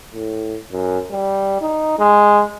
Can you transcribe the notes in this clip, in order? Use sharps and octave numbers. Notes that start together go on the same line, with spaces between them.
A2
F#2
G3
D#4
G#3